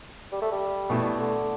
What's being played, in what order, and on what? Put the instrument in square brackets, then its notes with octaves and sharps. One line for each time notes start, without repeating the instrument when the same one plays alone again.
[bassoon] G3
A3
G3
[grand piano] B2 A3 E4
[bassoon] D3